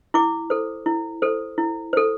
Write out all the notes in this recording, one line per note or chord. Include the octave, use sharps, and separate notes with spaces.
E4 D6
A4 C5
E4
A4 C5
E4
A4 C5